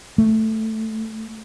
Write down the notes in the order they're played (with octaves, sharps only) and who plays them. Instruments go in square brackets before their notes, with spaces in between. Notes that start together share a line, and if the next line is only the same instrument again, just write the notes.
[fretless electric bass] A3